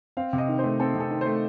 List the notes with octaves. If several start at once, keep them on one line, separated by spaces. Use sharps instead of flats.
C4 F5
C3
D#5
D#3
C5
A3
C4 A4
C3
A4
D#3
A3 C5